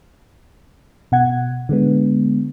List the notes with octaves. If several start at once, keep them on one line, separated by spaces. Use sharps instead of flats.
B2 F#5 G#6
D3 G#3 B3